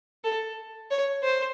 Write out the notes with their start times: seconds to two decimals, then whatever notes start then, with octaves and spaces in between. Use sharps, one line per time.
0.24 A4
0.91 C#5
1.23 C5